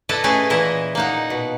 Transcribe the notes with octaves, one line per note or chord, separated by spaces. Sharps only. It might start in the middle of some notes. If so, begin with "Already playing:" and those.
E4 A4 B4 D5 D#5
A3 C#4 E4 G#4 B4 D#5
A#2 E3 E4 D#5
A#3 D#4 F#5
B2